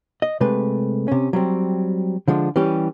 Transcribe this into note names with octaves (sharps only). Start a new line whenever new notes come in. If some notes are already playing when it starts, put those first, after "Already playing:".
D#5
C3 G#3 A3 B4
C3 C#4
F#3 G3 C4
D3 F3 G#3 C4 D4
E3 G3 C#4 G4